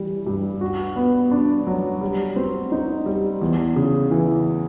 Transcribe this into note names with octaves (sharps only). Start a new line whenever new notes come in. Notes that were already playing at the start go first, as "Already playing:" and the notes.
Already playing: E3 G3
G2
F#4
B3
D4
F#3
G3
C4
D#4
G3
E2
C#3
E3